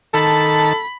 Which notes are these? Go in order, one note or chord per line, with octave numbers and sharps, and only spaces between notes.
D#3 A4 A5 B5